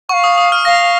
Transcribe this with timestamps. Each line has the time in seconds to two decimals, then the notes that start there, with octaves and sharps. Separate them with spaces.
0.09 F#5 C#6
0.13 F5
0.24 D#6
0.38 D#6
0.52 F6
0.65 F5 A#6